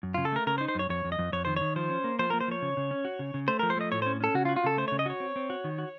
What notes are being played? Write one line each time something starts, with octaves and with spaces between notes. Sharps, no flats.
F#2
C#3 F4
A4
A3 A#4
C#3 A#4
C5
D#4
C5
F#2 C#5
F2 C#5
F2
D#5
F2
F2 C#5
D#3 C5
D#3 C#5
F3 C5
C#4
A#3
F3 C5
A#3 A#4
C5
F3 C#5
C#3
C#3
C#4
F#4
C#3
C#3
A3 C5
F3 A#4
C5
A3 D#5
A2 C#5
C#4 C5
C#4 A4
C#3 F#4
F4
F#4
F4
C#3 A4
A3 C5
C#3 C#5
D#5
F#4 C#5
C4
C4
F#4
D#3
F#4